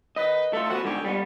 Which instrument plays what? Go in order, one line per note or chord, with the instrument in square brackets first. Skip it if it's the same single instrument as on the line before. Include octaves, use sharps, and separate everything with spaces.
[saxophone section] D#3 D#4 B4 [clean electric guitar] D#5
[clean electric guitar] A3 F4 [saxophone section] A4
[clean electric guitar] F3 B3 [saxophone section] F#4
[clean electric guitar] G#2 D3 [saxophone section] G4 C#5
[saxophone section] F2 [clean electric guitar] G3 B3